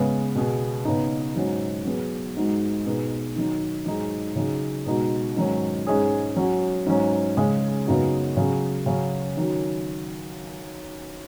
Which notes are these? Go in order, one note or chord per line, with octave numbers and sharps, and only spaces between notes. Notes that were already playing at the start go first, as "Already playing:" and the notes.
Already playing: C#3 G#3 B3 G#4
B2 B3 G#4
C#3 B3 D#4
G#2 F#3 C#4 F#4
F#3 B3 G#4
G#2 G#3 D#4 F#4
B2 B3 D#4 G#4
D#3 F#3 D#4
G#2 F#3 D#4 G#4
C#3 F#3 D#4 G#4
B2 G#3 D#4 F#4
G#2 D#3 F#3 C#4
G#2 G#3 C#4 G#4
F#3 C#4 F#4
G#2 F#3 C#4
C#3 G#3 C#4 G#4
F#2 C#3 B3 D#4 F#4
C#3 F#3 C#4 G#4
C#3 F#3 C#4 F#4
D#3 F#3 C#4 F#4